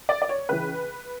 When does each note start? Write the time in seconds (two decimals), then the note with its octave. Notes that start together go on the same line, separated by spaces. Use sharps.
0.09 D5
0.22 D5
0.29 C#5
0.49 C#2 C#3 E3 B4